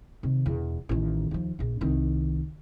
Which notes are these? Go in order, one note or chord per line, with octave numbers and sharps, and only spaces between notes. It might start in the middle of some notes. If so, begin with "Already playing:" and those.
C3 D#3
E1 E2
A1 D#3
D#2 F3
A#1 D4
C2 D#3